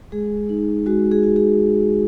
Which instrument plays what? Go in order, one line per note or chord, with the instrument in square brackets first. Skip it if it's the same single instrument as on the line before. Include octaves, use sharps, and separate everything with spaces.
[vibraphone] G#3 G#4
D#4
G#3 F#4
G#4
F#4
G#4